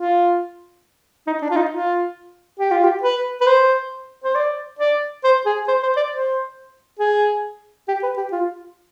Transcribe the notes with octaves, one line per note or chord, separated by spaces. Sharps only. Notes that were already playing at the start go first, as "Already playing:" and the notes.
Already playing: F4
D#4
D4
F4
D#4
F4
G4
F4
G4
B4
B4
C5
C5
D5
D5
C5
G#4
C5
C5
D5
C5
G#4
G4
B4
G4
F4